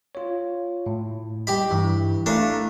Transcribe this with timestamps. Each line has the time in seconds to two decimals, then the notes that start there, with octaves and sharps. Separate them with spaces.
0.15 F4 C#5
0.86 A2
1.47 G3 G4 D#5 B5
1.70 G2 E3 E4
2.26 A3 D4 E4 F5 A#5